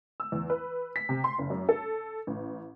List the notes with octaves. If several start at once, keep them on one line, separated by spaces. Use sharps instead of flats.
E6
E2
B4
B6
C3
C6
F#1
F#2
A4
A1